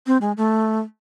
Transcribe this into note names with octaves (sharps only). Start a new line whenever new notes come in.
C4
G#3
A3